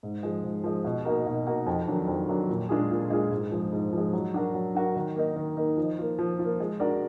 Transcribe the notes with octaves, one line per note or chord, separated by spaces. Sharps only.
G#2
F3 G#3
G#2
F3 G#3
B2
A#3 D#4 F#4 A#4
B2
A#3 D#4 F#4 A#4
F2
D#3 F#3 D4
F2
D#3 F#3 D4
A#2
G#3 D4 F4 G#4
A#2
G#3 D4 F4 G#4
G#2
F3 G#3
G#2
F3 G#3
F#3
D4 F#4 A#4
F#3
D4 F#4 A#4
D#3
A#3 D#4
D#3
A#3 D#4
F3
A#3 F4
F3
A#3 F4
G#3
D4 F#4 A#4 D5